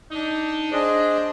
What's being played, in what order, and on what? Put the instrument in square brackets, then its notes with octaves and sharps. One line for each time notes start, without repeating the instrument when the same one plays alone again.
[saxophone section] D4 D#4
[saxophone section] D4 [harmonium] G#4 C5 D#5